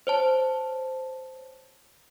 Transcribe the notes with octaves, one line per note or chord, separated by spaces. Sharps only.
C5 C#5 A5